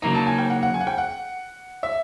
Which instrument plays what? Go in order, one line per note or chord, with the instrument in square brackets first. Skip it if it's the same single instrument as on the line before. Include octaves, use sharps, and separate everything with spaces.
[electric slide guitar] C#3 F#3 A#3 D#4 [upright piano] A#5
[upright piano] A5
G#5
G5
F#5
F#5
G#5
F#5
G5
F#5
E5